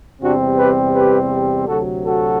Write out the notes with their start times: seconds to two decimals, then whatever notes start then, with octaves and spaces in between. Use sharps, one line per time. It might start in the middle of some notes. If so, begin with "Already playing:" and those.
0.21 E2 C3 G3 C4 D4 F#4
0.58 G4 B4
0.94 G4 B4
1.67 D2 C3 F#3 F#4 A4
2.04 F#4 A4